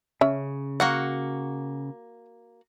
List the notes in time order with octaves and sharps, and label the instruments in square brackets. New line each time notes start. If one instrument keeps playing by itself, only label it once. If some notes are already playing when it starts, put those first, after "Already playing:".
[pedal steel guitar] C#3 [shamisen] C#4 E5
[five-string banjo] A#3 F#4 F#5